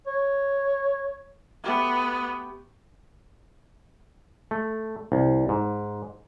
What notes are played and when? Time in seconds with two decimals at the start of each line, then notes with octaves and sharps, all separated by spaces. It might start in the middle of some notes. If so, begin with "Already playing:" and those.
0.07 C#5
1.64 A3 B3 G4 F#5
4.51 A3
5.12 C2
5.49 G#2